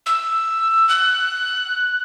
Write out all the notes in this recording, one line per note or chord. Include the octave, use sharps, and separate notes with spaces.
E6
F#6